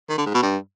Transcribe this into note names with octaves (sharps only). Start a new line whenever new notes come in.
D#3
D3
G#2
B2
G2